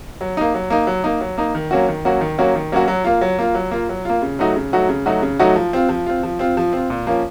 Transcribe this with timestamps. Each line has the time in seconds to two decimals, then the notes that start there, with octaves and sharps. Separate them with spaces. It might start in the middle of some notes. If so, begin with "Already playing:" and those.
0.21 F#3
0.37 A#3 D#4
0.54 F#3
0.70 A#3 D#4
0.87 F#3
1.04 A#3 D#4
1.21 F#3
1.38 A#3 D#4
1.55 D#3
1.71 F#3 A#3 C#4 F#4
1.88 D#3
2.05 F#3 A#3 C#4 F#4
2.21 D#3
2.38 F#3 A#3 C#4 F#4
2.55 D#3
2.72 F#3 A#3 C#4 F#4
2.88 F#3
3.04 A#3 F4
3.21 F#3
3.39 A#3 F4
3.55 F#3
3.71 A#3 F4
3.89 F#3
4.05 A#3 F4
4.22 C#3
4.39 F#3 A3 D#4 F#4
4.56 C#3
4.73 F#3 A3 D#4 F#4
4.89 C#3
5.06 F#3 A3 D#4 F#4
5.22 C#3
5.39 F#3 A3 D#4 F#4
5.56 F3
5.73 C4 F4
5.89 F3
6.06 C4 F4
6.23 F3
6.39 C4 F4
6.57 F3
6.73 C4 F4
6.90 A#2
7.07 F3 A#3 C#4